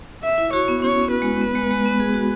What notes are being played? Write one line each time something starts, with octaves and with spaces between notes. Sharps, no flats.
E5
E4
F#4 C#5
B3
C#4 C#5
B3
B4
G#3
B3
G#3
G#3
B3
G#4
F#4